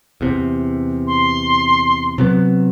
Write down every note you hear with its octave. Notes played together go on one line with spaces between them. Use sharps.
E2 C3
C6
C3 F#3 B3